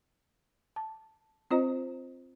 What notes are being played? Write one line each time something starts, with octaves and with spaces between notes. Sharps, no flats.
A5
C4 F4 C5 D#5 A#5